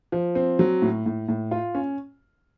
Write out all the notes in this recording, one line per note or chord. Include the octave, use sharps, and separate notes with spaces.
F3
C4
F#3
A2
A2
A2
F4
C#4